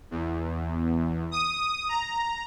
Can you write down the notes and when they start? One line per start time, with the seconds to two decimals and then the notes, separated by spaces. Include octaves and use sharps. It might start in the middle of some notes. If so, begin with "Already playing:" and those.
0.11 E2
1.32 D#6
1.89 A#5